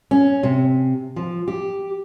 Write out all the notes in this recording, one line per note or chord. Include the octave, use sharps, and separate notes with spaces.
C#4
C3
F3
G4